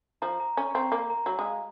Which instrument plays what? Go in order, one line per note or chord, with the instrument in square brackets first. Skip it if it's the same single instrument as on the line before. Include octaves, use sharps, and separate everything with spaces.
[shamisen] F3 [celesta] A#5
[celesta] A#5
[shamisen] C#4 [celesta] C#6
[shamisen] C4 [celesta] A#5
[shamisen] A#3 [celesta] A#5
[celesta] A#5
[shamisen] F#3 [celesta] A#5
[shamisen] G#3
[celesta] F5